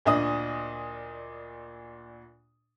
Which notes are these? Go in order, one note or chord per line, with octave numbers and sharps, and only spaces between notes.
D2 A#2 D4 D#5 D#6